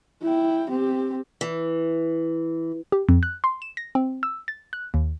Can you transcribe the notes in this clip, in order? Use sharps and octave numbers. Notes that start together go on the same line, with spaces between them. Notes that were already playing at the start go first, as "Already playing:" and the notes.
E4 G5
C4 G4
E3
G4
F2
F#6
C6
E7
A#6
C4
E6
A6
F#6
D#2